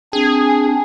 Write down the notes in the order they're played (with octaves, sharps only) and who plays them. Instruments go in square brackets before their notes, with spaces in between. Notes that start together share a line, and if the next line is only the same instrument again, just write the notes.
[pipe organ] C4 D4 [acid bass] G#4